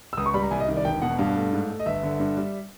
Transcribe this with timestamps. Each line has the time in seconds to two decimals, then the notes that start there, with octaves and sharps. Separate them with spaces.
0.13 E6
0.17 C#2 D#6
0.26 C#6
0.34 G3 B5
0.42 A#5
0.51 C2 G#5
0.60 D#5
0.68 D#3
0.77 D5
0.85 E1 G5
1.02 B2 F#5
1.18 G2 F5
1.36 A3
1.53 G#2
1.70 A3
1.80 D#5
1.86 G1 E5
2.03 D3
2.20 G2
2.37 G3